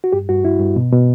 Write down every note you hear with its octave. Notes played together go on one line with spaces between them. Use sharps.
F#4
G2 G4
G2 F#4
G2 E4
G2
B2
B2